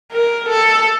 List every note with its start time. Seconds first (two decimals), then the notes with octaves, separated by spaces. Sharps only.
0.12 A#4
0.49 A4